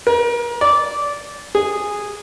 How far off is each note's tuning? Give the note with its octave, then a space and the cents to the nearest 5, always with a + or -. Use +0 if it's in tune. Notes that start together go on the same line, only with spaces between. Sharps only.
A#4 +35
D5 -15
G#4 -10